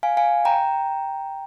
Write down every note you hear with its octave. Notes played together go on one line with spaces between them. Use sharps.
F5 G#5
F5 G#5
G5 A#5